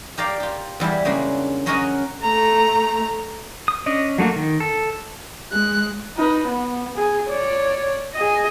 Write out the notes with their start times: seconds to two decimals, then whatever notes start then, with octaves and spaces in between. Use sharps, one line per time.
0.18 G4 A#4 D5 F5
0.40 F4 G4
0.80 E2 G3 E4 E5
1.05 C#3 G#3 A#3 D4
1.66 F#3 C#4 F#4 A#4 C#5 D#5
2.23 A3 A#5
3.68 D#6
3.86 C#4 D4 D#5
4.18 F#3 A3 A#3 F#4
4.36 D#3
4.60 A4
5.52 G#3 F#6
6.17 D#4 B4
6.47 B3
6.95 G#4
7.28 C#5 D5
8.14 G#4 D#5